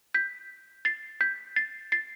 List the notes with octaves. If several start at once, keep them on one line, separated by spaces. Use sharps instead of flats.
G6 B6
A6 C7
G6 B6
A6 C7
A6 C7